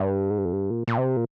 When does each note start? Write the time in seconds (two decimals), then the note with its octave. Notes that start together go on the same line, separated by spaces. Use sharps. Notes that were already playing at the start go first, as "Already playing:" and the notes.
Already playing: G2
0.30 G#2
0.38 G2
0.45 F2
0.53 G2
0.70 A#2
0.88 A#2
0.98 C3
1.17 A#2